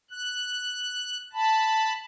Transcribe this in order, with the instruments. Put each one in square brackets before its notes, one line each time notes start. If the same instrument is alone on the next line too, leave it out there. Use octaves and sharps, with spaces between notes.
[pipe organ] F#6
A5 B5